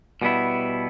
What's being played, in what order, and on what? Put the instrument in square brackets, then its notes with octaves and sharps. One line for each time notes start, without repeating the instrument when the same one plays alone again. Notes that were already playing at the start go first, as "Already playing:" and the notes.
[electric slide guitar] B2 G3 B3 E4